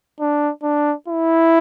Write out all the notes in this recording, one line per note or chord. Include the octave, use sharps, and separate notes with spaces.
D4
D4
E4